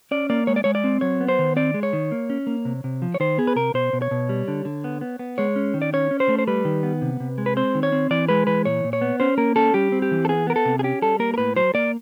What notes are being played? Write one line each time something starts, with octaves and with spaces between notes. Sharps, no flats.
C#4 D5
A#3 D5
G#3 C#5
D5
G#3 C#5
D5
C4
F#3 C#5
B3
C5
D#3
C4 D5
G#3
C#5
D#3
A#3
C#4
A#3
C3
C3
F3
C#5
D#3 C5
B3 G#4
B4
C3 A#4
B2 C5
B2
C#5
B2
G3
D3
D3
B3
B3
B3
G#3 C#5
C#4
D#3
D5
C#4 C#5
C#4
C5
A3
C5
G3 B4
D#3
B3
C3
C3
G#3
B4
C4 C5
D#3
C#5
C4
E3 D5
G#3 B4
E3 B4
A#2 C#5
A#2
C#5
B3
C#4 C5
A#3 A#4
C#4 A4
G3 G4
C4
G4
E3
A4
B3 G#4
B3 A#4
A4
C3
G#4
C#4 G4
G3 A4
A#3 A#4
A#4
A2 B4
F#3 C5
A#3 D5